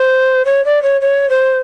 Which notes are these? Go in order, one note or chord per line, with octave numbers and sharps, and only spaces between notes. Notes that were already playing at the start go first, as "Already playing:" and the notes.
Already playing: C5
C#5
D5
C#5
C#5
C5